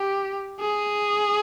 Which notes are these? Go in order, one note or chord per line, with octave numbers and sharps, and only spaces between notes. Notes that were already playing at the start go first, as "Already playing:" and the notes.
Already playing: G4
G#4